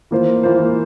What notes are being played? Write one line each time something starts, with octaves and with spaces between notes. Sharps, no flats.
E3 A#3 F4 C5
E3 A#3 F4 C5